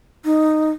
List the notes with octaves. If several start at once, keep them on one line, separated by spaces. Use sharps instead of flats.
D#4